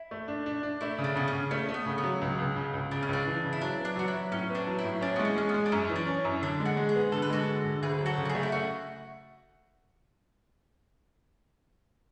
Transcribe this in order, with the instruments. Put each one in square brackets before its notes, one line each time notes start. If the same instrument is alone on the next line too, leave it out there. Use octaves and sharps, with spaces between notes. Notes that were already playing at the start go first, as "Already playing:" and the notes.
Already playing: [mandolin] E4
[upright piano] A3
D4
D4
D4
[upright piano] A3 [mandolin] E4
[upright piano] C#3
[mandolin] D4
[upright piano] C#3 [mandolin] B3
[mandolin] C#4
[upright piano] C#3
[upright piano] A3 [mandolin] C#4
[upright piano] A3
[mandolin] B3
[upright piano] C#3
[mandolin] B3
[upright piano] F#3
C#2
C#2
C#3
C#2
[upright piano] C#3 [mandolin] D4
[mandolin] C#4
[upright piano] C#2 [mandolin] D4
[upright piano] E3
C#3
[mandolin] E4
[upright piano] F#3 [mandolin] D4
[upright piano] B3
[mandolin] D4
[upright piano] F#3 [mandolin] F#4
[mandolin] E4
[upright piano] F#3
[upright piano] A2 [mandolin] C#4
[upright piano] B3
[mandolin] D4
[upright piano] F#3
[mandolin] E4
[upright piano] A2
[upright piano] C#4 [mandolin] D4
[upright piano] G#3 [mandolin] B3
[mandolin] C#4
[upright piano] G#3 [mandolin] C#4
[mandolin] B3
[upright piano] G#3
[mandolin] D4
[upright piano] F#2 [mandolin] C#4
[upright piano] E3
[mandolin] D4
[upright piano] C#4
F#2
[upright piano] D3 [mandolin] D4
[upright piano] G#3
[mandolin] F#4
[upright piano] G#3
[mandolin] G#4
[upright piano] B3
[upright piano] D3 [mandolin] A4
[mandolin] B4
[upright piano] G#3 [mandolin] F#4 A4
[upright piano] D3
D3
[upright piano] D2 [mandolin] G#4 B4
[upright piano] F#3
[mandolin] F#4 A4
[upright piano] C#3
[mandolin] F#4
G#4
[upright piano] A3
[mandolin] E4
[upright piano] A3 [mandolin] F#4